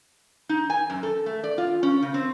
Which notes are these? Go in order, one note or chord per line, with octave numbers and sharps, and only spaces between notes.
D#4
G#5
F#2
A4
A3
D5
F4
C#4
C#3
C4